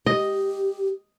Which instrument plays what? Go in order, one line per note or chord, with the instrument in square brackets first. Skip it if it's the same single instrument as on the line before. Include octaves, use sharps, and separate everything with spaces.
[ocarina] G4 [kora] D#5